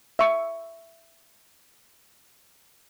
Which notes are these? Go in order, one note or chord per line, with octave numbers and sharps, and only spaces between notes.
E5 C#6